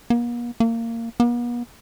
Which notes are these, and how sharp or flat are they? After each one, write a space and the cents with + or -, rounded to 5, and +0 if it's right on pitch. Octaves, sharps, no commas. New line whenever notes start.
A#3 +45
A#3 -20
B3 -45